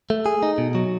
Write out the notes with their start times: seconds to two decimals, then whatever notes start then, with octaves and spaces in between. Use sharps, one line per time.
0.10 A3
0.26 G#4
0.43 D#4
0.58 B2
0.75 F#3